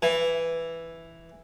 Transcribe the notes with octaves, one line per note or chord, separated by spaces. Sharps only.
E3